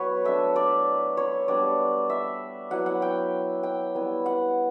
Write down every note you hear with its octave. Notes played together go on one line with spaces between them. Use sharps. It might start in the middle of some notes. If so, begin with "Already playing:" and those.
Already playing: F#3 B3 E4 B4 C#5
A3 D4 E5
D5
C#5
G3 B3 D4 D5
E5
F#3 B3 E4 F#5
F#5
G5
G5
G3 B3 E4
F#5